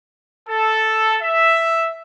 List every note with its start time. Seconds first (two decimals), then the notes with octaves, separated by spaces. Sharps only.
0.49 A4
1.22 E5